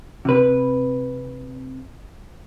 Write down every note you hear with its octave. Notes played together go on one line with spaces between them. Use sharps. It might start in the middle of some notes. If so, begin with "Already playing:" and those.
C3 B4